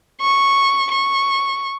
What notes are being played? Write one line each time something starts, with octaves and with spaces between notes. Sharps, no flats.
C#6
C#6